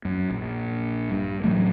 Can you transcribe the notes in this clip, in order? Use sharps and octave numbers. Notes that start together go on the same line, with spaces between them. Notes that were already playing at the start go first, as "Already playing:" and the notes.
F#2
A#1
G2
A2 E3 F#3 A3